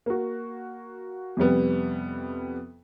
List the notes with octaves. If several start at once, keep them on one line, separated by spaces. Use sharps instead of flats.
A#3 F#4
F2 C3 G3 B3